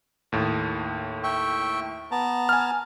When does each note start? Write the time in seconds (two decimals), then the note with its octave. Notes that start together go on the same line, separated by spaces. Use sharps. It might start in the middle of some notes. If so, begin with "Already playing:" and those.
0.32 D#2 A2
1.23 E5 G5 C#6
2.11 B3 A5 A#5
2.49 G#5 F6